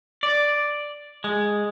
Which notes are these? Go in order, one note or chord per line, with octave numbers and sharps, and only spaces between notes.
D5
G#3